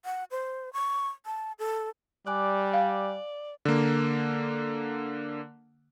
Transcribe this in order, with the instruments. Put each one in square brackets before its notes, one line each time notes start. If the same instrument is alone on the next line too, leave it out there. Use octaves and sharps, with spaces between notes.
[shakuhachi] F#5
C5
C#6
A5
A4
[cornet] G3 [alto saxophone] D5 [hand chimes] G#5 D6 F#6
[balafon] F5
[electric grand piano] D3 A#3